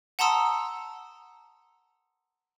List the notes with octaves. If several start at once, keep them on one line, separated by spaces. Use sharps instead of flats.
F#5 A5 A#5 C6 D#6 E6